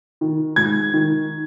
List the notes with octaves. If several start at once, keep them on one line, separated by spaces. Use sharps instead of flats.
D#3
G#2 G#6
D#3